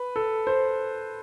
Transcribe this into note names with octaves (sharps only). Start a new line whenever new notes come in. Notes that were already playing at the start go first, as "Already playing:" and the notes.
Already playing: B4
A4
C5